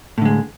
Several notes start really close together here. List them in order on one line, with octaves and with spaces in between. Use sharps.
A2 D3 G#3